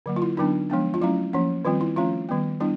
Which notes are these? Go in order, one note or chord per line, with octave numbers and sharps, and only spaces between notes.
D3 F#3 A#3
F4
E4
D3 F#3 B3 D4 D#4
F3 G#3 B3 D4
F4
F#3 A3 C#4 E4
F3 A#3 C#4
D#3 G3 C4 F4
E4
F3 A3 C#4 F4
D#3 G3 B3
G3 B3 D4 E4